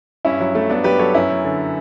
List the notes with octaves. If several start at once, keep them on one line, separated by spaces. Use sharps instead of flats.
G2 C#4 E4
F#3
F#3 A3
G2 B3 D4
F#3 G4 B4
F#3 A4 C#5
F#2 C#4 E4
F#2
D3